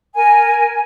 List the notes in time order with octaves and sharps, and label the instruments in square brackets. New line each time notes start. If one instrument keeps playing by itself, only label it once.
[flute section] A#4 G#5